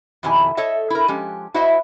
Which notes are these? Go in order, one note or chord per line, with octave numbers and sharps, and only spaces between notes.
F2 B2 D#3 E4 G4 G#5
A4 C#5 D#5 E5
E4 A#4
F3 G#3 C#4 G4
E4 F#4 C5 D#5 E5